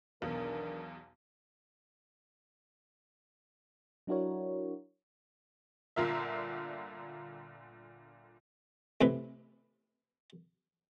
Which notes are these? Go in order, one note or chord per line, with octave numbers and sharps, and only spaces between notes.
B1 E2 B2 D#3 D4 A#4
F#3 D4 E4 F#4 A#4 C#5
G1 A#2 D3 F4 A#4 E5
A2 C3 B4